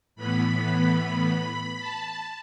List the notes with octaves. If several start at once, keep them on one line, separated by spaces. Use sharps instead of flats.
A2 E3 B3 B5
A5